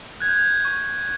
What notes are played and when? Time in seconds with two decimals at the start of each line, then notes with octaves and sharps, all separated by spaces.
0.20 F#6 G#6
0.29 G6
0.35 G#6
0.65 C#6